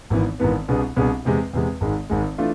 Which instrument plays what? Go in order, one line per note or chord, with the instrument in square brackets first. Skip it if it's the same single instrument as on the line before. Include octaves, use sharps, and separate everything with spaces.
[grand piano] G#1 G#2 E3 B3
G#1 G#2 E3 B3
C2 B2 B3 D4 G#4
C2 B2 B3 D4 G#4
E2 C3 G#3
E2 C3 G#3
G#1 G#2 G#3
G#1 G#2 G#3
E3 A3 D4 F4